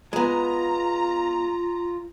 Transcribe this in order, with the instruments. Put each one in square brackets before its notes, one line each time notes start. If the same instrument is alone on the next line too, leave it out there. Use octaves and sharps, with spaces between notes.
[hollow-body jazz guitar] G#3 B3 [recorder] F4 [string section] A#5